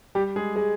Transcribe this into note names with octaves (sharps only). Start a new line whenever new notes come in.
G3 G4
G#3 G#4
G#3 G#4